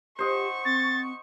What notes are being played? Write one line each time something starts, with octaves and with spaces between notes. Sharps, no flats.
G4 C5 D#5 F#5 C#6
C4 A6